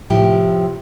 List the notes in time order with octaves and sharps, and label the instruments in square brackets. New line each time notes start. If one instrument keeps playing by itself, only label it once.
[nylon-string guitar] A2 C3 F3 E4 G4